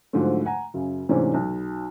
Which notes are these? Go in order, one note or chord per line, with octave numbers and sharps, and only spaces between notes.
G#2 D3 F3 F#3 A3
F#5 G#5 A#5
F#2 C#3
G#2 C3 E3 A3 C#4 D4
B1